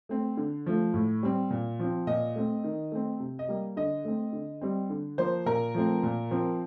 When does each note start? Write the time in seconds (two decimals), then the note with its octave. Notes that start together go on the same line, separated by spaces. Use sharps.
0.09 A3 C4
0.37 D3
0.66 F3 A3
0.94 A2
1.23 G3 C4
1.50 A#2
1.79 F3 C4
2.07 A#2 D#5
2.36 A3 C4
2.64 D#3
2.92 A3 C4
3.20 C3
3.39 D#5
3.48 G3 A#3
3.77 D3 D#5
4.04 A3 C4
4.33 D3
4.61 G3 C4
4.90 D3
5.18 F3 A#3 C5
5.46 A#2 A#4
5.75 F3 A3 C4
6.03 A#2
6.31 F3 C4